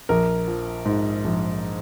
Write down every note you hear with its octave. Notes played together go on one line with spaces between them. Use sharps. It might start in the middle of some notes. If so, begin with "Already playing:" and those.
A#1 A#4
F3
G#2
A#1